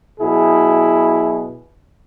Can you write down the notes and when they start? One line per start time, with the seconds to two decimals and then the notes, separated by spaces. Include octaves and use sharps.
0.20 B2 F#3 E4 G#4